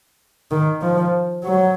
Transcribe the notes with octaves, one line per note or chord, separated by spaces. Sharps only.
D#3
F3
F#3